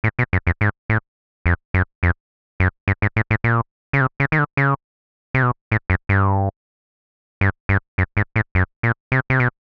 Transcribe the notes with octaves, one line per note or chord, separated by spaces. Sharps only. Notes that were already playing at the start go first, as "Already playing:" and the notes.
A2
B2
F#2
F2
G#2
A2
F2
F#2
F2
F#2
G2
G#2
A2
A2
A#2
C#3
C3
C#3
D#3
D3
C#3
C3
B2
A2
F#2
G2
G2
G2
F#2
G#2
A2
F#2
A#2
C3
C3
B2